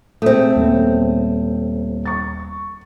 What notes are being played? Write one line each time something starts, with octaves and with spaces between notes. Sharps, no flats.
A3 C4 G#4 D#6
D#1 B3
C#6 A6